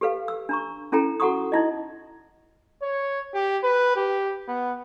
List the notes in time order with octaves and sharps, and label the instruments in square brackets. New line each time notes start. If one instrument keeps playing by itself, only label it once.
[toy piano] G4 A4 B4 F5
E6
D4 A#5 C#6
C#4 E4 A4 G5 A#5
F#4 A4 F#5 A#5 C#6 D#6
D#4 E4 D#5
[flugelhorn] C#5
G4
B4
G4
B3